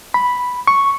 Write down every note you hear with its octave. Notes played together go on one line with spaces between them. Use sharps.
B5
C#6